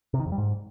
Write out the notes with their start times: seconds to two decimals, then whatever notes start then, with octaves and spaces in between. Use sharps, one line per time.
0.14 C3
0.20 D#3
0.26 F2
0.32 G3
0.38 G#2